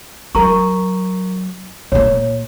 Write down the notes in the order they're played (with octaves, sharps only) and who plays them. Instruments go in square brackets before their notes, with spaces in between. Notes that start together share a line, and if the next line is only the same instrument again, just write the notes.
[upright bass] F#3 [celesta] A#4 A#5 C#6
[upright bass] A#2 A#3 [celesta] C#5